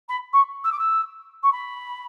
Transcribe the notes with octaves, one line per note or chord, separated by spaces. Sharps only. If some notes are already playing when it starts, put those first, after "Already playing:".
B5
C#6
E6
D6
E6
C#6
B5